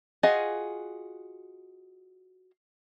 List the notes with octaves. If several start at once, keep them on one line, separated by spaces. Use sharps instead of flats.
F4 F#4 G#4 D#5